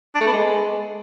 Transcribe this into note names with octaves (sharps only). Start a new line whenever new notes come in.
D4
A3
B3
G#3